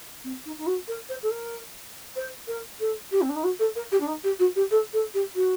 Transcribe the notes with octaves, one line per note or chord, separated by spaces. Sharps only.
C4
D#4
D#4
F#4
A#4
C5
A4
A#4
C5
A#4
A4
G4
C4
D4
D#4
F#4
A4
A#4
G4
D4
D#4
G4
F#4
G4
A4
A4
G4
F#4